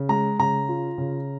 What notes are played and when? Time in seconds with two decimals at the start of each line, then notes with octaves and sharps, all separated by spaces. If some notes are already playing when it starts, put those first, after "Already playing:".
Already playing: C#3
0.09 G#3 A#5
0.39 C#3 A#5
0.68 F4
0.98 C#3